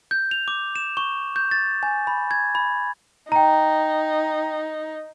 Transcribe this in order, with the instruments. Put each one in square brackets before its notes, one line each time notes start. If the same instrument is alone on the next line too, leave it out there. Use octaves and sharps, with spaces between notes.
[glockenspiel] G6
F7
D6
E7
C#6
G6
A6
G#5
B5
G#6
B5
[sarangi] D#4 [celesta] G5 A#5